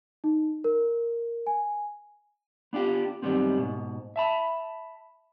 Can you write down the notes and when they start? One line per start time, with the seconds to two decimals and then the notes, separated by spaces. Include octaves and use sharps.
0.24 D#4
0.64 A#4
1.47 G#5
2.73 B3 D4 F4 G4
3.22 F#2 D#3 F#3 G3 B3 C4
3.58 G#2 B2
4.16 E5 A5 B5